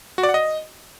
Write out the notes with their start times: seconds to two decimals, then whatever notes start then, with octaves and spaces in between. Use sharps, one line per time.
0.18 F#4
0.23 D5
0.29 F#5
0.34 D#5